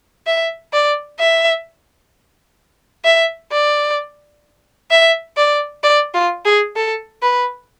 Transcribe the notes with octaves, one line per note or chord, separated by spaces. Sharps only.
E5
D5
E5
E5
D5
E5
D5
D5
F4
G#4
A4
B4